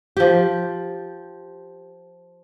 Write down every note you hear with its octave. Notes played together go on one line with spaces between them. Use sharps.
F3 G4